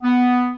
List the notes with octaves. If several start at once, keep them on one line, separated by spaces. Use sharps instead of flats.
B3